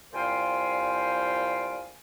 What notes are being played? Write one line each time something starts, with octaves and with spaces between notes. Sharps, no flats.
C2 A#2 C5 F5 G5 G#5